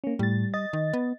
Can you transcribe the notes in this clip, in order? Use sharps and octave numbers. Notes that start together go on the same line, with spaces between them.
A#3 C#4
A2 G3 A6
D#5 A6
D#3
B3